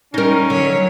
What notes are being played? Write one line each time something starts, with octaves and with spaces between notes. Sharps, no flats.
G3 C#4 D#4 A#4
D3 F#3 C#5